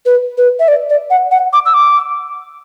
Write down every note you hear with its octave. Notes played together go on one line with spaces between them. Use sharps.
B4
B4
E5
D5
D5
F#5
F#5
D6
E6
D6